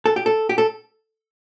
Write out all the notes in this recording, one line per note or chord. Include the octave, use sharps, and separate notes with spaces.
A4
G4
A4
G4
A4